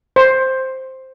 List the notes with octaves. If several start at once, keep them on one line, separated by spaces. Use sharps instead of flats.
C5